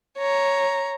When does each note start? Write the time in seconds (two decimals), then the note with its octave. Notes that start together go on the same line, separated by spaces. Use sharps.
0.18 C#5 A#5